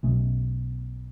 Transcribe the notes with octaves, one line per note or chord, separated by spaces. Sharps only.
B1 B2 A3 C#4